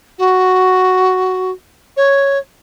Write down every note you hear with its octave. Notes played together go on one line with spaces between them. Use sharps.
F#4
C#5